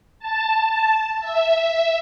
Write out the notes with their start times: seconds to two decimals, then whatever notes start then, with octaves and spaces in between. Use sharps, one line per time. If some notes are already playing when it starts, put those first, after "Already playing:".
0.20 A5
1.20 E5